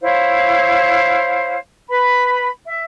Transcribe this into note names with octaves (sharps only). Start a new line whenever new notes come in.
E4 C5 C#5 F5
B4 B5
E5